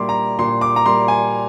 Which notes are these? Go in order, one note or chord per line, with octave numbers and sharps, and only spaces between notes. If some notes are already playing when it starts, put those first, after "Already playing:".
Already playing: A#2 G3 A#3 C6 D6
A#5
A#2 C6
D6
A#5
G3 A#3 C6
G#5